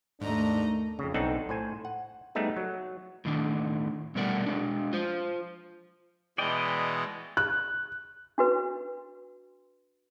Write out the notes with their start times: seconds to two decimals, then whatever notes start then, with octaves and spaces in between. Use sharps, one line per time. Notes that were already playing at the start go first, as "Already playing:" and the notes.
0.21 D#2 G#2 A3 D4 D#5 A#5
0.99 F2 C#3
1.14 B1 C4 D4 D#4 A4 F#5
1.49 A2 C5 G#5
1.85 F#5
2.35 G3 A3 B3 D#4 G#4
2.57 F#3
3.25 A2 D#3 D4
4.15 B2 G3 A3 A#4 D5 F#5
4.46 G#3 D4
4.93 F4 C5
6.38 B2 E3 G#3 D5 D#5 G5
7.37 F#6
8.38 D4 F#4 B4